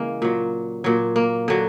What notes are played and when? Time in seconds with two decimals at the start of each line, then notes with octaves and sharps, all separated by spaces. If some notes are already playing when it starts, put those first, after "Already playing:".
Already playing: C#3 E3 G#3 A#3
0.22 A#2 F#3
0.84 A#2 F#3
1.16 A#3
1.48 D3 F#3